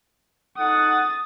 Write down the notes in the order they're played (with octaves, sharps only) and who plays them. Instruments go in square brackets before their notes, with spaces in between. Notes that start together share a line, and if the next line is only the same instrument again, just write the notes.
[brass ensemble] D#4 A4 F#5 [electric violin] D#6 A6